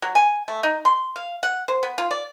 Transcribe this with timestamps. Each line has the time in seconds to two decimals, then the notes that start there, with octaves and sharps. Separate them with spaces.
0.02 F#3
0.15 G#5
0.48 A3
0.63 D#4
0.85 C6
1.16 F5
1.43 F#5
1.68 C5
1.83 B3
1.98 F4
2.11 D5